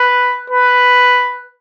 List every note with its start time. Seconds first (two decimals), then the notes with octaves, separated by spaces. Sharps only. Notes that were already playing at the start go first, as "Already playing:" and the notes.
Already playing: B4
0.50 B4